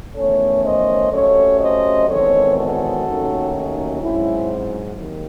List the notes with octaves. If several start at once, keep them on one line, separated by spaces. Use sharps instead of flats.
E2 D#3 A3 C#4 A4 C#5
C5 D#5
C3 F#3 A3 C#4 A4 C#5
C5 D#5
E2 D#3 G#3 C4 A4 C#5
F#4 A4
D#2 D#3 F#3 A3 C#4
D#4
G#2 F#3 C4 C#4 E4
D#2 D#3